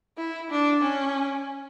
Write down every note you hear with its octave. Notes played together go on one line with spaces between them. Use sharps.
E4
D4
C#4